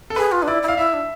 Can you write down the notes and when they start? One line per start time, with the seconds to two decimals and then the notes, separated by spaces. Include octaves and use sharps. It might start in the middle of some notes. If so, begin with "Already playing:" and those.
0.10 A4
0.16 G#4 B4
0.32 F4
0.42 D4
0.48 E4 D5
0.62 E4
0.68 F5
0.77 E4 E5
0.93 D4